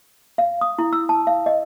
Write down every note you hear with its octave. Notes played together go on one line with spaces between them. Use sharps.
F5
D#6
E4
E6
A5
F5
D#5